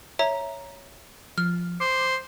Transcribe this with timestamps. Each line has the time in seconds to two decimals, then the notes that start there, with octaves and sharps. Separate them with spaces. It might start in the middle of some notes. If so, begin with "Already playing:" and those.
0.19 C#5 E5 A#5
1.38 F3 F6
1.80 C5 D6